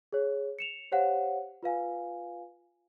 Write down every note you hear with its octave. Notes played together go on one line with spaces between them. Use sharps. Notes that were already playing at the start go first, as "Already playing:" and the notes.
G#4 C#5
C#7 E7 F7
G4 C5 C#5 F5 F#5
F4 B4 F5 G#5